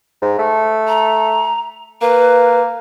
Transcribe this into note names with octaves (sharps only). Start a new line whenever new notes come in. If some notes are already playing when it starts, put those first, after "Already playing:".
G#2
A3
A#5
A#3 B4